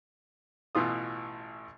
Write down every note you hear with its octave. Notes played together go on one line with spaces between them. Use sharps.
A1 B2 E3 F4 D#6